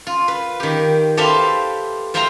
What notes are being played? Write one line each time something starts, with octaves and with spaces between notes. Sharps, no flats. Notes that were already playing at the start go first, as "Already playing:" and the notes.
F4
B4
D#3 G4
G4 A4 B4 C5 E5 F5
F4 C5 E5 F5 G5 A#5